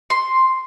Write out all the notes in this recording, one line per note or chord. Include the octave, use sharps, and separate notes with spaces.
C6